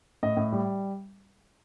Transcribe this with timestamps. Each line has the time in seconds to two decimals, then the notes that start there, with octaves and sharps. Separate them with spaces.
0.23 A2 D#5
0.37 A2
0.52 G3